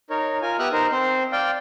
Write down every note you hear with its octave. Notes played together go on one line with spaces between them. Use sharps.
D#4 A#4 C#5
F4 A#4 G#5
B3 G4 E5 D#6 F6 F#6
D#4 A#4 C5
C4 C5 C6
D5 F5 G5